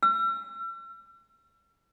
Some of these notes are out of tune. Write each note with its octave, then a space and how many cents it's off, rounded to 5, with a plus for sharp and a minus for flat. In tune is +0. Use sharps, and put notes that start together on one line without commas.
E6 +45